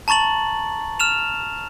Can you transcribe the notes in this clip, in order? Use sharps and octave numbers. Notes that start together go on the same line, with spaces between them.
A5 A#5 C#6 A6 F#7
F6 E7 F7